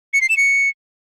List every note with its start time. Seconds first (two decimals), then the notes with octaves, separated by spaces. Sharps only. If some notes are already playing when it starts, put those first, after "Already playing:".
0.14 C#7
0.21 C7
0.29 E7
0.37 C#7